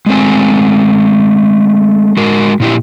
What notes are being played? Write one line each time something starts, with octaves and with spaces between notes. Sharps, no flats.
G#3 A3 C4 G#5
G#3 F#4 A#4
A#2 E4 G4